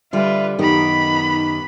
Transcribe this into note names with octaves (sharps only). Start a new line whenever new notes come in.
D3 G3 F4 B4 E5
F#2 D#3 B3 D#4 G4 B5